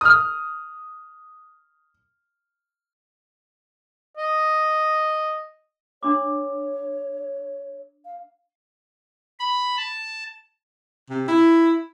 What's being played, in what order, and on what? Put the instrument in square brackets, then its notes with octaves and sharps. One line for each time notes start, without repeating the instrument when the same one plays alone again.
[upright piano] D#6 F6
[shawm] D#5
[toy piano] D4 C6 D6 [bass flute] C#5
[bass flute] F5
[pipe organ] B5
A5
[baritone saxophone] C3
E4